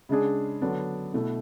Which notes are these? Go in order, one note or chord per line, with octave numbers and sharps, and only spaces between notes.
C#3 G#3 D4 G#4
D3 F#3 B3 D4
B2 A3 E4